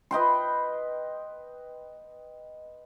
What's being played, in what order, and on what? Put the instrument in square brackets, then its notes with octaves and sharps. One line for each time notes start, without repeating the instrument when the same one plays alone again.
[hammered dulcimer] B4 D#5 G5 C6